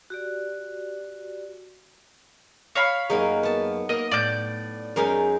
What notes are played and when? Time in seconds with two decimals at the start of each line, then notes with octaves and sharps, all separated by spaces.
0.10 F#4 G4 D5
2.75 C#5 F5 B5
3.10 F#2 F#3 A#3 D#4 G#4
3.43 B3 A5
3.89 A#3 D#5
4.11 A2 D5 G6
4.96 F#2 G#3 C#4 D#4 A#4